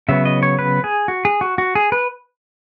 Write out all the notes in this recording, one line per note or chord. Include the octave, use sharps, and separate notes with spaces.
C#3 F#3 B3 E5
D#5
C#5
B4
G#4
F#4
G#4
F#4
F#4
G#4
B4